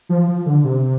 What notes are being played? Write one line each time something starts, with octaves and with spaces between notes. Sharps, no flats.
F3
F3
D3
C3